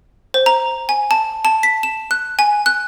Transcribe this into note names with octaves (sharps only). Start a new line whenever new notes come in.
C5
A#5
G#5
A5
A5
B6
E7
F#6
G#5
F#6